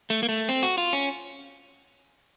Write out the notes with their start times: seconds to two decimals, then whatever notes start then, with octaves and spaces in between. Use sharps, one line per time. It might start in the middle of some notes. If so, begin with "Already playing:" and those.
0.10 A3
0.23 A#3
0.29 A3
0.49 C4
0.63 F#4
0.78 F4
0.93 C#4